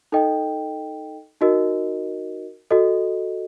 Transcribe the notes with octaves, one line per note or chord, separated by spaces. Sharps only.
D#4 A4 D#5 G5
D#4 F#4 A#4 D#5
F#4 A4 D#5